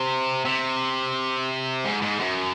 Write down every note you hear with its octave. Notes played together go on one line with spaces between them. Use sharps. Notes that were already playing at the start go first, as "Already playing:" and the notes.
Already playing: C3
C3
G#2
G#2
F#2